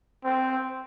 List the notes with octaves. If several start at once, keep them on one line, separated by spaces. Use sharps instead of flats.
C4